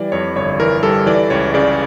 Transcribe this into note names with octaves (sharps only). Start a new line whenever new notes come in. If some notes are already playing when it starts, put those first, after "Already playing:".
Already playing: E3 G3 D5
F2 C#5
G1 C#5
E3 A#4
G3 A4
E3 D5
C#2 C#5
C#3 D5